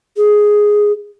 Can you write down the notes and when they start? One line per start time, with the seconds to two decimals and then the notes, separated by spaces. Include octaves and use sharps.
0.17 G#4